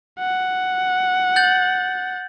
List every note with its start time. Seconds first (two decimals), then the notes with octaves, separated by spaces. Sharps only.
0.19 F#5
1.36 G6 A6 F#7